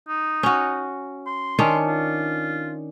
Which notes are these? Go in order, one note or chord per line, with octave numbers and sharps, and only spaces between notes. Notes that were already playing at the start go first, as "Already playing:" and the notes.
D#4
C#4 F#4
C6
D#3 C#4 D4
F4